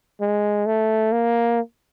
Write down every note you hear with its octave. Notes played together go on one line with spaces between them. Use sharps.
G#3
A3
A#3